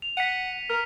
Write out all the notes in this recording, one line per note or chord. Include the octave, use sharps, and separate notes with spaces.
F7
F#5 B6 C#7 D#7
A#4 F6